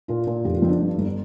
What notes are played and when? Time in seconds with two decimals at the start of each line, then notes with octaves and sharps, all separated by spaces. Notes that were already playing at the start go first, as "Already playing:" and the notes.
0.08 A#2 F4
0.27 A#2
0.45 F1 G4
0.56 F4
0.62 F2 C4
0.69 D4
0.81 G2
0.98 G1